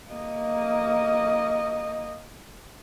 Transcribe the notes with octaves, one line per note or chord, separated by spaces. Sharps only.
A#3 D#5